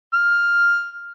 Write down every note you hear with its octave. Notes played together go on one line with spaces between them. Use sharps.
F6